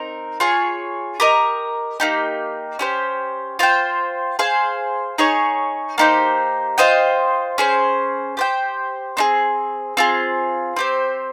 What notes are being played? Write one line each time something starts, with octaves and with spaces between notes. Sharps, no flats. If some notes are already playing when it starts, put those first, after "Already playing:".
Already playing: C4 D#4 A#4
F4 G#4 C#5
G4 A#4 D#5
A#3 D#4 G4
C#4 G4 C5
F4 C5 G5
G#4 C5 F5
D#4 G#4 C#5
A#3 D#4 G4 C5
F4 C5 D#5 G5
C#4 G#4 C5
G4 C5 G5
C4 D#4 G#4
C4 F4 G#4
C4 G4 C5